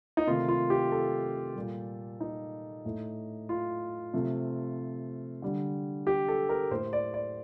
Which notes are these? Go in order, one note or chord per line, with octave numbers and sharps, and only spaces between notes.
D#4
C3 D#3 A3 F4
F4
G4
A4
A#2 G3
D#4
A2 A3
F4
C3 F3 A3
D3 G3
G4
A4
A#4
A2 A3 C5
D5
D5